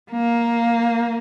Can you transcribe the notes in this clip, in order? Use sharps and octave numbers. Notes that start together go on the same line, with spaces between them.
A#3